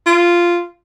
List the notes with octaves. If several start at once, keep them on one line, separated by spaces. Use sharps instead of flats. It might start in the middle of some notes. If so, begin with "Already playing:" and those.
F4